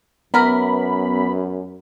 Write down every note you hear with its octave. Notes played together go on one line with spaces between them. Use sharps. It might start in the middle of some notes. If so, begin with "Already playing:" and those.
F#2 E3 B3 A#4 B5